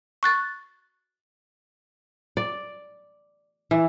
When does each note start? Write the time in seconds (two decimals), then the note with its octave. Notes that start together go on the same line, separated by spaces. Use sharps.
0.23 C#6 F#6 A6
2.37 D5
3.71 E3